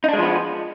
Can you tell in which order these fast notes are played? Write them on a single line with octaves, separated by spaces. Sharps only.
D#4 D4 G#3 F3 B3